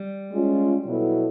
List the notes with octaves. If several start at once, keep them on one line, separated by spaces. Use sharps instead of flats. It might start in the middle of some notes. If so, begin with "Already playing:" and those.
Already playing: G3
G#3 C#4 F4
B2 F#3 B3 E4 A4